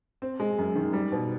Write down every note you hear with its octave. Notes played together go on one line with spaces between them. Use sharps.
C4
G#3
F#2
D#3
G3
B2